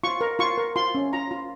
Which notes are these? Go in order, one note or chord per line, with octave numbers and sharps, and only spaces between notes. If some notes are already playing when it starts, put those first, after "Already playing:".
F4 C#6
A#4
F4 C#6
A#4
F4 C6
C#4
F4 A#5
F4